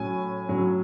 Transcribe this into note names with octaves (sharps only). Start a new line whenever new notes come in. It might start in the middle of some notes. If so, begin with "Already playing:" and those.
Already playing: A2 F#3 C#4 G#5
A2 F#3 C#4